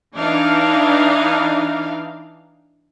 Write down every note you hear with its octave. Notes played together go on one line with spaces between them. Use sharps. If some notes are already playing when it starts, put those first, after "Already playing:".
E3 D4 D#4 F5